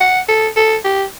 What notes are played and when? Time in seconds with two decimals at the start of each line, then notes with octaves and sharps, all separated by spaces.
0.01 F#5
0.28 A4
0.56 A4
0.84 G4